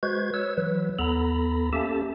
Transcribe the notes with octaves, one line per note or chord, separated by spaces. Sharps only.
G#3 F#4 B4 C5 G#6
B4 C#5 E6
E3 F#3 B4
D#2 B3 A4 A#5 B5
A#3 C#4 G4 A4 E5 A5